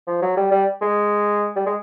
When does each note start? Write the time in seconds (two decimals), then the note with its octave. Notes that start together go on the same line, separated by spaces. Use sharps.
0.07 F3
0.22 F#3
0.37 G3
0.51 G3
0.81 G#3
1.56 G3
1.66 G#3